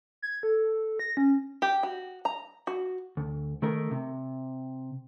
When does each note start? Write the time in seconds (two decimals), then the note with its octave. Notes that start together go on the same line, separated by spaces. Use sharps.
0.22 G#6
0.43 A4
0.99 A#6
1.17 C#4
1.62 G4
1.83 F#4
2.25 A#5
2.67 F#4
3.17 D2
3.62 D#3 A3 A#4
3.91 C3